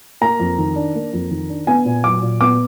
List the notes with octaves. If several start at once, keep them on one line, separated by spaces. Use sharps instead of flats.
A#3 A#5
F2
D#3
D4
A#3
F2
D#3
D4
B3 G#5
A#2
F#3 D6
A#2
B3 D6